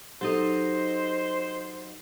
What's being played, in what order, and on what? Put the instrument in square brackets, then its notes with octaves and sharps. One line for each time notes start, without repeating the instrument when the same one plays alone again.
[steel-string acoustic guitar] F#3 D#4 D#5 [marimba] G4 A4 [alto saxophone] C5